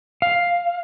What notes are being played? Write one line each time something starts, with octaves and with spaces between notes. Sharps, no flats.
F5